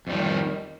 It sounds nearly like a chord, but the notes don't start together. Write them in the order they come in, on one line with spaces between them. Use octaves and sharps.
F2 G3 D#3